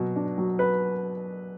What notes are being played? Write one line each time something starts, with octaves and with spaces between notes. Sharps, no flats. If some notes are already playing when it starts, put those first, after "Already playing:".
Already playing: B2 F#3 B4
D4
F#3
B4